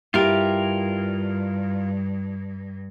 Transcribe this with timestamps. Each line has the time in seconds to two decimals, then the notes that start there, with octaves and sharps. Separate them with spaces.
0.14 G2 E4 F4 G4 A#4